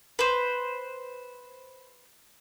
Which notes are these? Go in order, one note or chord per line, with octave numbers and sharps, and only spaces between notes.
B4 C5